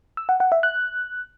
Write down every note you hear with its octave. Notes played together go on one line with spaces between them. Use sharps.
E6
F#5
F#5
E5
F#6